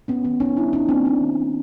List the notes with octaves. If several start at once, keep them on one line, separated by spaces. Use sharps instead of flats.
B3 C#4
D#3 B3 C#4
C#4 D#4
G3 D4 E4
C#4 D#4
A#3 C4 D4
C4 D4
D#3